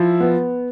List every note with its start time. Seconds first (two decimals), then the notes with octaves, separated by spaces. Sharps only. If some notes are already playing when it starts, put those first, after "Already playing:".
Already playing: F3 E4
0.20 B3